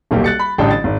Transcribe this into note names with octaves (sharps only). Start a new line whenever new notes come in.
D#1 B1 A#3 G4
F#6 A6 C#7
B5
A1 D3 G3 G5 A5
A6
G#1